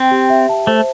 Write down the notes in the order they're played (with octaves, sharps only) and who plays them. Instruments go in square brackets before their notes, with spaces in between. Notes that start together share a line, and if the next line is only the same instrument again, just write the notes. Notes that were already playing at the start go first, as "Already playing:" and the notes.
Already playing: [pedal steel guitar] C4 [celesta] G5
[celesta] G4
E5
A5
[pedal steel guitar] A3 [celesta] C5